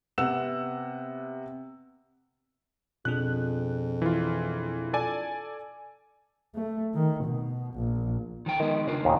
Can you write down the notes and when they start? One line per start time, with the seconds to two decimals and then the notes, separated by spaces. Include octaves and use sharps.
0.18 C3 B3 F#5 E6 E7
3.05 F2 B2 D4 G#4 F#6
4.02 E3 F4
4.93 A4 D5 G#5
6.55 A3
6.95 D#3
7.25 B2
7.75 A#1
8.46 D#3 F3 G5
8.60 D#3 G#3 B3 D#4 A#4
8.87 C#3 D4 F4
9.05 D#2 A#2 D#3